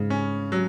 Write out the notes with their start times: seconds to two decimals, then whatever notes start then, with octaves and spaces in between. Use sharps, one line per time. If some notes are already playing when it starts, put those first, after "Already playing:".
Already playing: G#2 C#3
0.10 C#4
0.52 F#3